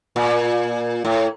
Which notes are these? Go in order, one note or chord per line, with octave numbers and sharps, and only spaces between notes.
A#2
A2